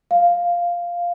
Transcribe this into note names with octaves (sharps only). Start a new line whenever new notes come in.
F5